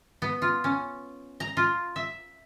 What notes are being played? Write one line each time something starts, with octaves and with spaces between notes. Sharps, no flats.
B3
F4
C#4
A#5
F4
E5